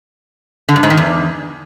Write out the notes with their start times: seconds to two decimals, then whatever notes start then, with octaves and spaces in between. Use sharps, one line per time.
0.69 D3
0.76 G2
0.83 G#2
0.90 D#3
0.97 E2